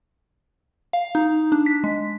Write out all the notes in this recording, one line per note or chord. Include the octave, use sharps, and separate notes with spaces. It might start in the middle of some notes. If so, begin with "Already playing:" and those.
F5
D#4
D4
B6
G#3